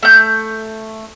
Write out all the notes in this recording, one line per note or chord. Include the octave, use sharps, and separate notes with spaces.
A3 G6